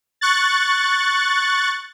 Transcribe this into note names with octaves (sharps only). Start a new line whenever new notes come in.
C#6 F#6 A6